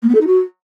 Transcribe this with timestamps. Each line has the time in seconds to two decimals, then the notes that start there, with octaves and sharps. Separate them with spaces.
0.02 A#3
0.09 B3
0.15 A4
0.21 D#4
0.27 F#4